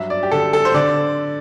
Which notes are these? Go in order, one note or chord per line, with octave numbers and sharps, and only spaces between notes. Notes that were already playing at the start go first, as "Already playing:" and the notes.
Already playing: G2 F#3 E5
D5
G4
D3 A4
A4
C5
D3 D5